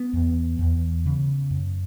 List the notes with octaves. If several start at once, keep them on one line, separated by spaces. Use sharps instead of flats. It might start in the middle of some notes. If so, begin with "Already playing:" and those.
Already playing: B3
E2
E2
C#3
F#2